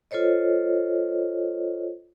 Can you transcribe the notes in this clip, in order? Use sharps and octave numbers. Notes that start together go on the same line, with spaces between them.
F4 A4 C5 C#5 D#5